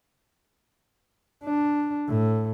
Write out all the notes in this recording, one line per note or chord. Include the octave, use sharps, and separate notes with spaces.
D4
A2